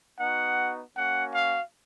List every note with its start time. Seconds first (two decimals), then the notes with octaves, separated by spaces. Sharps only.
0.20 B3 D#4 F#4 F#5
0.96 A#3 C#4 F#4 F#5
1.34 F5